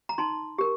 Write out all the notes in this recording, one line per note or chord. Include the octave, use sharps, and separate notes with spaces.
A#5
D#4 A5 C6
G4 A#4